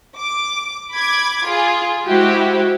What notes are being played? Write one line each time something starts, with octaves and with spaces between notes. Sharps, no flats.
D6
B5 D6 G#6
F4 G#4
G#3 E4 F#4 G4 C5